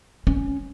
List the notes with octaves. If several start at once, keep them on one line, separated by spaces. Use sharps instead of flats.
C#4